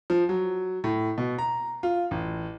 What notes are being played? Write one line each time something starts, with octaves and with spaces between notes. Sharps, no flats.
F3
F#3
A2
B2
A#5
F4
A1